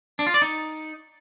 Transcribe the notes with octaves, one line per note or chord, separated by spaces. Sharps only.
D4
F4
D5
D#4